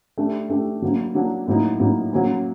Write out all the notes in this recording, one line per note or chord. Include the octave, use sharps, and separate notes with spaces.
A3 D4 G4
A3 D4 G4
F#3 A#3 D4
F#3 A#3 D4
A2 F#3 A#3 D#4
A2 F#3 A#3 D#4
F#3 A#3 C#4